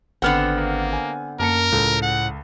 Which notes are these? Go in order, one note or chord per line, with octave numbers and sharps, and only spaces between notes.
G#1 D3 B3 C4 F#5 F6
A#3
G#5
F#2 A#3 A#4 A5 C#7
C#2 A2 A4
F#5